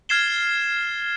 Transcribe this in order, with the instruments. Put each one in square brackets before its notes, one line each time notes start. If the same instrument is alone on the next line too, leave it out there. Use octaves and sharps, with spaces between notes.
[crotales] F6 G#6 A6 C7 E7 G7